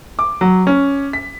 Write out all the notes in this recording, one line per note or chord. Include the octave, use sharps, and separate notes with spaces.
D6
F#3
C#4
B6